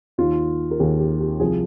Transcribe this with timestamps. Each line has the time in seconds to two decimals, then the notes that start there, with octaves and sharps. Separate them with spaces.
0.18 D#2 D#3 F4
0.71 A#4
0.80 D#2 D#3 G#4
1.00 G4
1.20 G4
1.40 C2 C3 F3 G#4